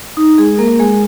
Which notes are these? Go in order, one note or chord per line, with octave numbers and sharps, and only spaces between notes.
D#4
G#3 G#4
A#3 A#4
G#3 G#4